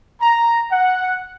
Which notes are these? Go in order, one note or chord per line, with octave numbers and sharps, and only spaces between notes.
A#5
F#5